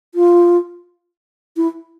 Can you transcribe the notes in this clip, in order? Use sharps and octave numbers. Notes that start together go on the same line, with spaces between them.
F4
E4